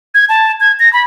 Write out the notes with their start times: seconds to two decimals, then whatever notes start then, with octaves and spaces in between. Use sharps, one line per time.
0.14 G#6
0.29 A5
0.60 G#6
0.80 A#6
0.93 B5